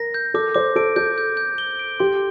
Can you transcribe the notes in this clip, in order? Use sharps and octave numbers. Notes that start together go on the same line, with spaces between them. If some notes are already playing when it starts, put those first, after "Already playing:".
Already playing: A#4 A#6
G6
A4 D6
C5 D6
A4 D7
A4 G6
G6
G6
G7
D7
G4 C6